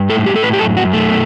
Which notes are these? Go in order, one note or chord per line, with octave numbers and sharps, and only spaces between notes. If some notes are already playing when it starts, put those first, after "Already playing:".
Already playing: G2
A2 A4
G4
A2 A4
B4
G4
F#2 A4
F#4
F#2
A3
B2